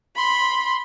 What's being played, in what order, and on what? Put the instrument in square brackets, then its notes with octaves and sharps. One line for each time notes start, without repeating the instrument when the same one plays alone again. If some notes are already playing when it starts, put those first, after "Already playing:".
[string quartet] B5 [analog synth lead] C6